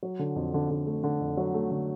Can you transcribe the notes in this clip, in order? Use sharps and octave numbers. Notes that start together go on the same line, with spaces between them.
F#3
D3
F2
D3
D3
A3
D3
F2
F#3
A3
D3